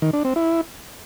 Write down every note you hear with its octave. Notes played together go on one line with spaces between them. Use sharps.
D#3
D4
C4
E4